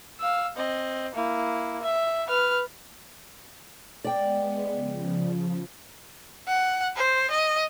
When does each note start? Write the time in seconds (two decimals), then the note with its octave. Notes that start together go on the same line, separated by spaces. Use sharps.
0.20 F5 E6
0.57 C4 D#5
1.15 A#3 E4
1.83 E5
2.28 B4 F6
4.04 G#3 B3 D5 G5
4.71 C#3 F3
6.48 F#5
6.97 C5
7.31 D#5